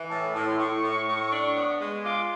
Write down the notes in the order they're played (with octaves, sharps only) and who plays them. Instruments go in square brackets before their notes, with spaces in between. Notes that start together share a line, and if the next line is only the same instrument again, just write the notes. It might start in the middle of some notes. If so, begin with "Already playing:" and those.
Already playing: [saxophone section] E3
[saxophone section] A2 [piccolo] A5
[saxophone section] A2 [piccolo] A5
[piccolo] C6
[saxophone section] A2 [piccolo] C#6
[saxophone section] A2
A2
D4
B3
G#3
[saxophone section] F4 [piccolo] D6